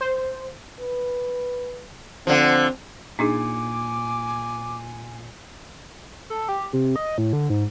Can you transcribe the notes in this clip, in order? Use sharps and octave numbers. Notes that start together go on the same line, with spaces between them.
C5
B4
D3 F3 C4
A#2 D4 D#4 G#4 G#5 D6
A4
G4
C3
D#5
A2
D3
G#2